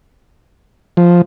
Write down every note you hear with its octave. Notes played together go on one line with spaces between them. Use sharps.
F3